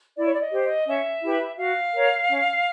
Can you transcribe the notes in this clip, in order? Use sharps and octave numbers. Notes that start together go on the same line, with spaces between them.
E4 D5
C#5
D5
D#5
G4 C5
D#5
C#4 E5
E4 G4 B4
F#4 F5
A#4 C#5
C#4